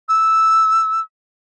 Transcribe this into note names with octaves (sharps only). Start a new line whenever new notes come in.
E6